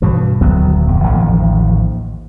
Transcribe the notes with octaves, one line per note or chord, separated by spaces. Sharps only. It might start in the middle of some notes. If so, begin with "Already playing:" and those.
G2 B2 E3
D#1 D2 F#3 B3
D1 F2
A1 D#2 F3